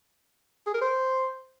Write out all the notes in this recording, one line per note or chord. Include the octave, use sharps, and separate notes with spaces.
G#4
A#4
C5